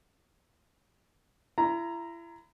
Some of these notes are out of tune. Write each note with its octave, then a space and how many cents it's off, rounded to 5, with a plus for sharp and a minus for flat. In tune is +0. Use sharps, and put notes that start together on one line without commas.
E4 +35 A#5 +0